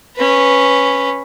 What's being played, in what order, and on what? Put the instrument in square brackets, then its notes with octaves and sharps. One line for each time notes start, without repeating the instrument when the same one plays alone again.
[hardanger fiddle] C#4 B4